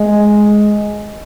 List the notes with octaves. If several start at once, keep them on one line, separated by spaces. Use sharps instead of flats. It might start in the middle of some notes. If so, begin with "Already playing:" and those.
Already playing: G#3